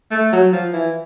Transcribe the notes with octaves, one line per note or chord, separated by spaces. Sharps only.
A3
F#3
F3
E3